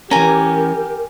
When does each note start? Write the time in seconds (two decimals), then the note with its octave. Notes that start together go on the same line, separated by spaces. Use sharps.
0.11 E3 C#4 G4 A#4 G#5 A#5